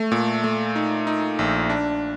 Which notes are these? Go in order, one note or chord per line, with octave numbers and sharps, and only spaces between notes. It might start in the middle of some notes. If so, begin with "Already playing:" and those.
Already playing: A3
A#2
A3
D#4
D#4
A#1
D4